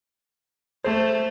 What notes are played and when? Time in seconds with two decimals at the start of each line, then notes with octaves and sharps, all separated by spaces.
0.84 A3 C5